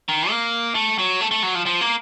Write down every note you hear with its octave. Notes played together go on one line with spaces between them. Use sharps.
D#3
A#3
A3
F#3
A3
A3
F#3
F3
F3
A#3